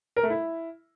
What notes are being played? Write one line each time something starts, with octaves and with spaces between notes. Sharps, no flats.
A#4
A3
E4